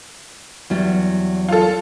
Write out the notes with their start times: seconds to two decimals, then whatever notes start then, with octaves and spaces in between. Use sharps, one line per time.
0.70 E2 F#3 G3
1.49 F4 A4